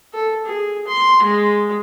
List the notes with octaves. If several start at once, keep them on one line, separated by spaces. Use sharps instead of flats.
A4
G#4
C6
G#3